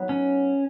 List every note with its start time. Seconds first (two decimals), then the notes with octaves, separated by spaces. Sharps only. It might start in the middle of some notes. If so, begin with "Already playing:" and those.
Already playing: F#3 B3 D#4
0.09 C#4